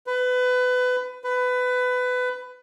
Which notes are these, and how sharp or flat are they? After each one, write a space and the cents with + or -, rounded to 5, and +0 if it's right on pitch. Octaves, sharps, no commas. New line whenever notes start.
B4 +25
B4 +20